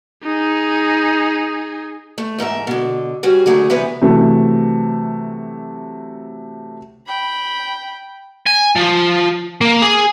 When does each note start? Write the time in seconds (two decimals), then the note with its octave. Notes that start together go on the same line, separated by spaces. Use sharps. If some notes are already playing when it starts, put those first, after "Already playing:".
0.23 D#4 G#4
2.18 A3
2.38 E2 G#2 A#4 E5
2.67 B2 D3
3.23 G3 C#4 F#4 G#4
3.46 D3 F#3 A3 G#4
3.70 C3 E3 G3 B3 B4 G#5
4.02 C3 E3 F#3 A3
7.06 G5 B5
8.46 G#5
8.76 F3
9.61 A#3
9.82 G#4